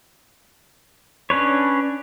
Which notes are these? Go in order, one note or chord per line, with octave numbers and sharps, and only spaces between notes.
C#4 D4 B4 C#5